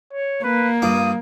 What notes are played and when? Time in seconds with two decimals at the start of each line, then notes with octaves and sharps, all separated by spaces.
0.13 C#5
0.43 A#3 B4
0.82 G2 F4 D6 D#6